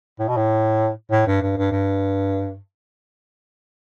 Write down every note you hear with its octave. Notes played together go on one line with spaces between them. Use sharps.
A2
B2
A2
A2
G2
G2
G2
G2